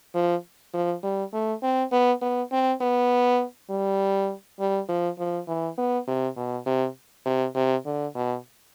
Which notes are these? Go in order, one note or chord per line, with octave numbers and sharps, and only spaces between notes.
F3
F3
G3
A3
C4
B3
B3
C4
B3
G3
G3
F3
F3
E3
B3
C3
B2
C3
C3
C3
D3
B2